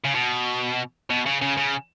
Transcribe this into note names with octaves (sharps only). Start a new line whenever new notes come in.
C#3
B2
B2
C#3
C#3
C#3